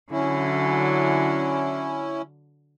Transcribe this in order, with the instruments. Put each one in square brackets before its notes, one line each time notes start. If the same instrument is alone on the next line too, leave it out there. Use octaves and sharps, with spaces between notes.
[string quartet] D3 F#3 [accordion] C#4 E4